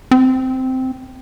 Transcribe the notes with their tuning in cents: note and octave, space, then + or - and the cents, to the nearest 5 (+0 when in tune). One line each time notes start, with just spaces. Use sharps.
C4 -10